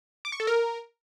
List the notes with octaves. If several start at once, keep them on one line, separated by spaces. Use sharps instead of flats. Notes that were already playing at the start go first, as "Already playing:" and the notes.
D6
C#6
A4
A#4